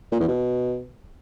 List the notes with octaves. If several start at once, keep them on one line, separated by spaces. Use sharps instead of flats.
A#2
E2
B2